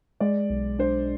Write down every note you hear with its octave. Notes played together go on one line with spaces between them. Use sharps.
G#3 D5
B1
D4 C5